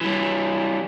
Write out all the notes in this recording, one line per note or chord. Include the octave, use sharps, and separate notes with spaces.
E3 G3